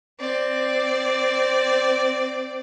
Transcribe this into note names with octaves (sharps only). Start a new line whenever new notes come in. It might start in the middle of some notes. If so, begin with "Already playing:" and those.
C4 D5